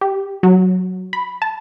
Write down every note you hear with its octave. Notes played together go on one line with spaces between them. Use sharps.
G4
F#3
B5
A5